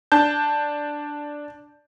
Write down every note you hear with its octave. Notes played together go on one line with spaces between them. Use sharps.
D4 A5 G6